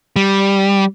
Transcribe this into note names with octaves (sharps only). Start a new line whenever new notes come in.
G3